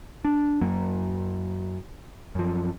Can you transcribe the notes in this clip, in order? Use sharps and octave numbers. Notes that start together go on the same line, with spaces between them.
D4
F#2 F#3 A#3
F#2 F3